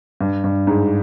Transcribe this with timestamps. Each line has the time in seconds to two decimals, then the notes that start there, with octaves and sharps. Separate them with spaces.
0.21 G2
0.44 G2
0.67 G#2